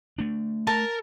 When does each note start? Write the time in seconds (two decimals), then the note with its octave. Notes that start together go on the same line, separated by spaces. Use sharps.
0.19 A3 D4
0.67 A#4 A5